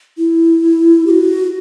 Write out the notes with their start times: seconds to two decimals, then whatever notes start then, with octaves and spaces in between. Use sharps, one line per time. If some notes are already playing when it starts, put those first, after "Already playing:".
0.18 E4
1.07 G4
1.10 F#4